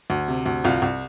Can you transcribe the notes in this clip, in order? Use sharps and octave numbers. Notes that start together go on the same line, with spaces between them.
D2
C3
D2
C2 F4
C2